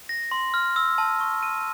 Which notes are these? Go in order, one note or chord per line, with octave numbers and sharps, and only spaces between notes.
A#6
C6
F6
E6
A5
C#6
D#7